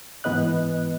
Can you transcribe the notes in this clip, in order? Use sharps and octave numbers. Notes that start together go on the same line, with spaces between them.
G#2 E3 B3 B4 D#5 F#6